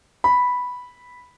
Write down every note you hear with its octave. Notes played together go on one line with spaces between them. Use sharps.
B5